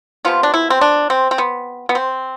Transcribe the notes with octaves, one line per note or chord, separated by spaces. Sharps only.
C3 F3 B3 F4
D4
E4
C4
D4
C4
C4
B3
B3
C4